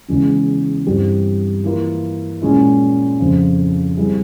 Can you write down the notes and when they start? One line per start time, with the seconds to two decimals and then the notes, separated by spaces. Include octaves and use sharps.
0.08 E2 C#3 E3 G#3 C#4
0.87 G2 E3 G3 C4 G4
1.64 E3 A#3 F4 A#4
2.42 A#2 G#3 C#4 E4 G#4
3.19 F2 C#3 F3 C4 F4
3.97 G3 C4 E4 G#4